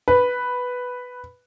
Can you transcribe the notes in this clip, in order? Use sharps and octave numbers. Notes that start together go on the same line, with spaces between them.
B4